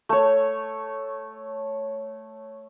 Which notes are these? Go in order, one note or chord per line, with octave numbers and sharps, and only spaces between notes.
A3 C#5